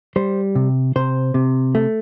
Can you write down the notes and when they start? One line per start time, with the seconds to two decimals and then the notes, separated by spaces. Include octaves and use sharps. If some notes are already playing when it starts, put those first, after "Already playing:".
0.16 G3 C5
0.55 C3
0.96 C3 C5
1.34 C3
1.75 A3